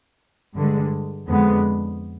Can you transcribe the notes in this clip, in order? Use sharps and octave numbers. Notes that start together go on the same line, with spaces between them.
G2 D3 G#3
F2 D3 G#3 B3